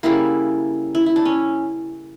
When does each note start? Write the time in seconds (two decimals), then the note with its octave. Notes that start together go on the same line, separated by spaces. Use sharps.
0.03 C#3 G3 A#3 E4
0.95 E4
1.06 E4
1.16 D4
1.25 C#4